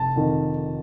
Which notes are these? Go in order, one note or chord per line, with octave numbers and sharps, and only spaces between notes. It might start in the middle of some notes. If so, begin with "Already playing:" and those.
Already playing: F1 A5
F2 D#3